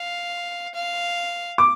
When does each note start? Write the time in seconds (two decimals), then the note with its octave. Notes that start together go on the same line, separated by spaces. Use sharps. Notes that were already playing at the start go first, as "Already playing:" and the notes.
Already playing: F5
0.75 F5
1.58 D6